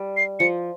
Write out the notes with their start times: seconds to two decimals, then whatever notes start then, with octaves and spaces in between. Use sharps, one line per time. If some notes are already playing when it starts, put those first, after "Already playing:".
Already playing: G3
0.17 C7
0.40 F3 C#7